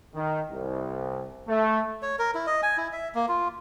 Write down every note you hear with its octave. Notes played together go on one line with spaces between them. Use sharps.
D#3
C2
A3
C#5
A#4
E4
D#5
G#5
E4
E5
A#3
F4